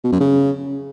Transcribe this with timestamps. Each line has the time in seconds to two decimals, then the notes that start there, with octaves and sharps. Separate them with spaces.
0.04 B2
0.12 F#2
0.20 C#3